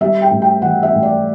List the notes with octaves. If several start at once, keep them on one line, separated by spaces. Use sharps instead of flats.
G3 E5
G5
A2
G5
E3 F#5
E5
A2
D5